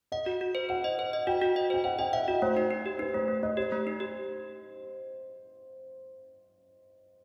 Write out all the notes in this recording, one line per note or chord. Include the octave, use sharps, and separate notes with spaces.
D#5 F#5
F#4
F#4
C5
C5 F#5
D#5
C5
D#5
F#4 G5
F#4
D#5
C5 G5
C5 F#5
D#5 G5
E5 F#5
F#4 D#5
A3 C5
D#4
D#4
G4
D#4 B4
A3 C5
A3
A3 D#5
G4 C5
A3
D#4
G4